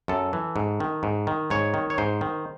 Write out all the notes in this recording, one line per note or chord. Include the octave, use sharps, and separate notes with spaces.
F#2 A4
E3
G#2
D#3
G#2
D#3
G#2 C#5
D#3
C#5
G#2 C5
D#3